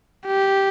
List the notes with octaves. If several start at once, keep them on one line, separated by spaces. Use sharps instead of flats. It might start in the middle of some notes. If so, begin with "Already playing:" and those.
G4